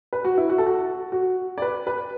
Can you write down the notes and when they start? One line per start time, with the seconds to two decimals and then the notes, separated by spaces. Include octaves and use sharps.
0.13 B4
0.25 F#4
0.38 E4
0.50 F#4
0.58 A4
0.66 F#4
1.12 F#4
1.58 D5
1.62 B4
1.87 B4